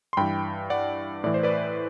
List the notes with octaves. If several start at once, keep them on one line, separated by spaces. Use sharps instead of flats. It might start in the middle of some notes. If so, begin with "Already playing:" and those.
C6
G2 E3 G5 B5
D5 F#5
A2 E3 D5
C5
B4 D5